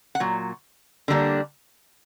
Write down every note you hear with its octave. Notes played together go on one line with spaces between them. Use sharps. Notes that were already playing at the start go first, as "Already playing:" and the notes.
F#5
A#2 F#3
D3 G3 A#3 D4